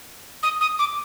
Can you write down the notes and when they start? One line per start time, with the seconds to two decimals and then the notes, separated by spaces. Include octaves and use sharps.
0.43 D#6
0.61 D#6
0.79 D6